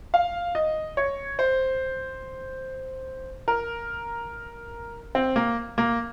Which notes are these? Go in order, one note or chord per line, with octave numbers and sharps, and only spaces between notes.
F5
D#5
C#5
C5
A#4
C4
A#3
A#3